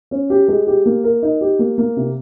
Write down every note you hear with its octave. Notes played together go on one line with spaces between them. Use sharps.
C#4
G4
G#3
G4
A#3
A#4
D#4
G4
A#3
A#3
C3